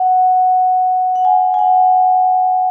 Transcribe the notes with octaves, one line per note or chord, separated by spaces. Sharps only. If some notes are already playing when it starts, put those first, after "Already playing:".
Already playing: F#5
F#5
G#5
G#5
F#5